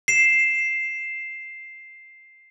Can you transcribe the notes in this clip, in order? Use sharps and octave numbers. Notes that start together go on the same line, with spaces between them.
C7 E7